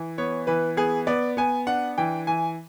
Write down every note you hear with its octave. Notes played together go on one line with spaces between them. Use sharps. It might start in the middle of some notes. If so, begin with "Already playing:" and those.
Already playing: E3
B3 C#5
E3 B4
B3 G#4
B3 D5
B3 G#5
D4 F#5
E3 G5
E3 G#5